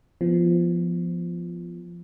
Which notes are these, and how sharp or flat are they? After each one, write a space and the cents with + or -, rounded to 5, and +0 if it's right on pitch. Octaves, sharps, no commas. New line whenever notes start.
F3 -15 B3 +0